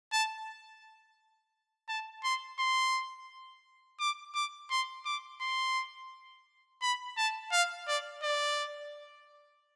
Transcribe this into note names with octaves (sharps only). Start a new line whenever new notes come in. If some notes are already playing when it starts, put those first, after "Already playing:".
A5
A5
C6
C6
D6
D6
C6
D6
C6
B5
A5
F5
D5
D5